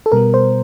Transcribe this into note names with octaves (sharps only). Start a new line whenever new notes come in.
A4
B2 G3 B3 A#4
C5